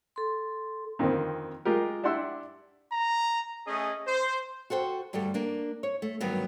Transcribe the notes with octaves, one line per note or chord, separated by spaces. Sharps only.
A4 C6
F2 D3 D#3 A#3 C4
G#3 F4 G4 A#4
D4 E4 G4 F#5 C6 E6
A#5
A3 C#4 G#4 D#5
C5
F#4 A4 C5 G5
D2 G2 G3 F#4 A4
A#3 D4
C#5
A3
D2 G2 D#3 F#3 G3 B3